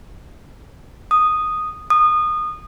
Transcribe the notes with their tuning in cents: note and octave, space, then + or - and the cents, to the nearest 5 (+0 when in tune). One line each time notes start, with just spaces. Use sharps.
D#6 -5
D#6 -25